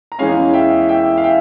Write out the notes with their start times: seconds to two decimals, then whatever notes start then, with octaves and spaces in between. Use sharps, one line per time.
0.12 A#5
0.19 E2 E3 G#3 C#4 F5 G#5
0.54 E5 G5
0.89 E5 G5
1.17 F5
1.24 E5 G5